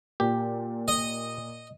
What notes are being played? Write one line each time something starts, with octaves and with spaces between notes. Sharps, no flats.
A#2 G4
D#5